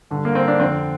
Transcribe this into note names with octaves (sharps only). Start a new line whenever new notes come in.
G2 D3
A#3
C4
D4
F2 D3 C4